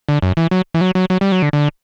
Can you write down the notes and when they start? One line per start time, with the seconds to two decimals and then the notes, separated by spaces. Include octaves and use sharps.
0.09 D3
0.22 F#2
0.37 E3
0.51 F#3
0.74 E3
0.81 F#3
0.95 F#3
1.10 F#3
1.21 G3
1.32 F#3
1.42 D3
1.53 D3